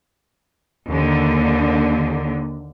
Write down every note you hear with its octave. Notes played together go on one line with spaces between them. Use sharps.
D#2 D3